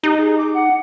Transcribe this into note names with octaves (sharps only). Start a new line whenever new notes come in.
D#4 G4
G#4
D6
F#5